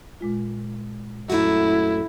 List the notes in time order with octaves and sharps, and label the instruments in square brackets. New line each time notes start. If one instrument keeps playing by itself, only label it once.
[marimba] A#2 G#3 F4
[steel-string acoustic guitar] F#2 A3 F#4 [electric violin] E4